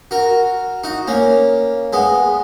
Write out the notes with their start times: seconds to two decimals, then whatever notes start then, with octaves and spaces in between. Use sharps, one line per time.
0.11 F#4 A#4
0.84 D#4 F#4
1.07 A#3 C#4
1.93 G#3 B3